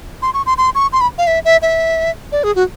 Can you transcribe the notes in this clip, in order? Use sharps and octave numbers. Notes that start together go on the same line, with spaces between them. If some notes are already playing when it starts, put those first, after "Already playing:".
C6
C#6
C6
C6
C#6
C6
B5
F5
E5
E5
E5
D5
G#4
F#4